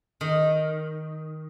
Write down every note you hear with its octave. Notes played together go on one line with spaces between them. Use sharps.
D#3